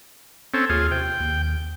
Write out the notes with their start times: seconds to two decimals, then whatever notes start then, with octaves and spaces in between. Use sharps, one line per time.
0.54 C4 C#4 A4
0.70 D#2 F4 G#4
0.91 C3 G5
1.20 D#2